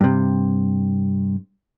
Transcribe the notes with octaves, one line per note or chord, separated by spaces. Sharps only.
G2 C3